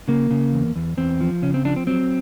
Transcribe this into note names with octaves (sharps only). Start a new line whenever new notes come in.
C#3 A#3
C#3
E2
E2
E2 C4
F3
C#3 C#4
C4
F3 D4
C4
F#3 C4